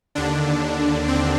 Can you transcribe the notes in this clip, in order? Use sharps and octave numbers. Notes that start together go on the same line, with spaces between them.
D#2 D3 D4
C4